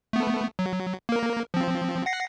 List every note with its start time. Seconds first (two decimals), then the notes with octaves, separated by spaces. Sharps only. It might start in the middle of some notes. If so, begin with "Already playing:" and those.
0.13 A3 B3
0.59 F#3
1.09 A#3 A#4
1.54 F3 C4
2.06 F#5 A#6 C7